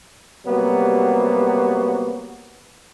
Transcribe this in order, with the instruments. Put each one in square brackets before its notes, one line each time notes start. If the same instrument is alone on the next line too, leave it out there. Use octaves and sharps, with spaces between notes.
[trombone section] C3 F#3 G3 A#3 B3 F#4